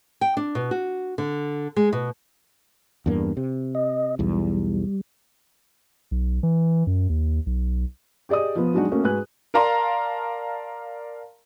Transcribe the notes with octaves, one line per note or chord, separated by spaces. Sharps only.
G5
D4
B2
F#4
D3
G#3
B2
E2 G2 A#3
C3
D#5
B1 E2 G3
B1
E3
F#2
D#2
B1
G4 G#4 D5 D#5 D#6
F3 B3
F#3 G#3 D4 D#4 F#4
A3 A#3 C#4 F#4
G#2 F#4 B4 G#5 F#6
A#4 D5 F5 A5 A#5 C6